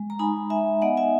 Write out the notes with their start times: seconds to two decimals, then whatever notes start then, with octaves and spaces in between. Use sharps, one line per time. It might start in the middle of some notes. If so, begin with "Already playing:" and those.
Already playing: G#3
0.10 A#5
0.19 D#4 G#5 B5
0.50 D#4 E5 G#5
0.82 B3 D#5 F#5
0.97 E5 G#5